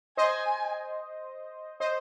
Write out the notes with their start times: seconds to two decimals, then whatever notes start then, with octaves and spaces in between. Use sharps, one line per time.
0.17 C5 D#5 G#5
1.80 C5 D#5